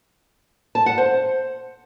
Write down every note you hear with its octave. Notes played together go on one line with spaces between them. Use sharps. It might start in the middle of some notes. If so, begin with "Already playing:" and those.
A5
F#5
C5